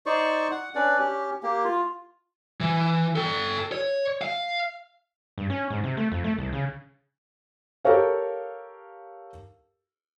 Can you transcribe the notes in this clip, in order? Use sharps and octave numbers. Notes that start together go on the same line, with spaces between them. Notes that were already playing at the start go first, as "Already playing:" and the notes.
D#4 C5 D5 C#6
F#5
C#4 D4 B4 D5
C#4 G4
A#3 G4
F4
E3
A4 G5
C#5
F5
G2
C#4
G#2
C3
A3
F2
A3
C2
C#3
G4 A4 A#4 C#5 F5